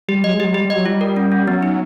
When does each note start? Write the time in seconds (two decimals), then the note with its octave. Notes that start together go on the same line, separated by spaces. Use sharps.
0.08 G3 G4
0.23 F#3 D#5
0.34 G#3
0.40 F#3 G4
0.54 G3 G4
0.65 G3
0.70 D#5
0.75 F#3
0.85 G3 F4
1.01 A#4
1.16 C#4
1.32 C#4
1.47 F#3 B3
1.63 D#4